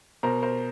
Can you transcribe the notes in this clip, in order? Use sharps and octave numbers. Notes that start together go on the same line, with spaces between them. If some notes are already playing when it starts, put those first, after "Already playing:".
B2 A#4 C5
A#4 C5